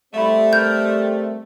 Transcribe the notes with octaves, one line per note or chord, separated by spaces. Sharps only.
G3 A3 C4 E5 B5
A#4 G6